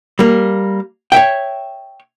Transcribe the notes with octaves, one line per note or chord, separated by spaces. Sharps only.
G3 A#3
C#5 D5 E5 G5